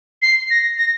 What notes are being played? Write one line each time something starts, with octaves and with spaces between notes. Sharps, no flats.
C7
A#6
A#6